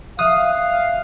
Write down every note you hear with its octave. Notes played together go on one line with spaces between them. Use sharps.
E5 F5 D#6 F#6